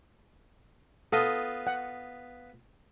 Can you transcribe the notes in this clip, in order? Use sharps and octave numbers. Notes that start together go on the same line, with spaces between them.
B3 F4 A4 D#5
F#5